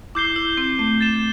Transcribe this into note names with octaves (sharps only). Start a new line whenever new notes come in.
E4 D6 G6 C7 G7
E4
C4
A3
A6 E7 G7